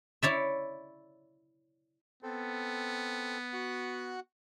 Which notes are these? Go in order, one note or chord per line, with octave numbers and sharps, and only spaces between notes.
E4 C#5 D5 E5
B3 C4 A4
F#4 F#5